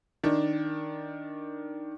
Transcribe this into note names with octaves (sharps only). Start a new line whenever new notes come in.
D#3 D4